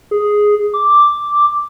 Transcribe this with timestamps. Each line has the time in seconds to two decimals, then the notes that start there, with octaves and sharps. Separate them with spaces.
0.11 G#4
0.74 D6